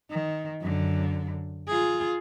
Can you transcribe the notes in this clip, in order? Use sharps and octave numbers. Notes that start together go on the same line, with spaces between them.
D#3
F#2 D3
F4 G#4